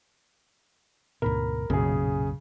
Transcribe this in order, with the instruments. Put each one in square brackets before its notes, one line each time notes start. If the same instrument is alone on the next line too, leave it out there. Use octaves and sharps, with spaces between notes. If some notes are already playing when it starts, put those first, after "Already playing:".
[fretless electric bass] D2 G#2 B2 [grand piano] A#4 B5
[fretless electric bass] B1 F#2 A#2 [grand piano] C#3 G#4